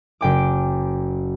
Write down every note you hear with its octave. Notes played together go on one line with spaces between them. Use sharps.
F#1 G5 D6